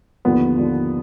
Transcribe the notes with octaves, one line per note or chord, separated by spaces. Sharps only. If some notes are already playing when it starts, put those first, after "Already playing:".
D#2 D3 F3 B3
D#2 D3 F3